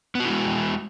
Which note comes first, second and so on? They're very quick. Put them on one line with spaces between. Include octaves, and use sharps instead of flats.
B3 F#4 E4 G#3